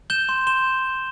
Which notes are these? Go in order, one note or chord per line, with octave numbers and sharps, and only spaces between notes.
G6 E7 G7
C6
C6 E7 G7